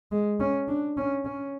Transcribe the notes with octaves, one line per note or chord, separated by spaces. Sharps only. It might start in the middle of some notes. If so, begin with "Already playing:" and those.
G#3
C#4
D4
C#4
C#4